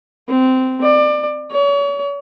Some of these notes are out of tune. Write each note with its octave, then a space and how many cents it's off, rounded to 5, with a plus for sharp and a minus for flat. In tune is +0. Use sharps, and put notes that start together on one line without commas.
C4 -15
D5 +25
C#5 +40